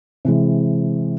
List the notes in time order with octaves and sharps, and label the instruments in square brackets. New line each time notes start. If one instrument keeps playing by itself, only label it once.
[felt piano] C3 E3 G#3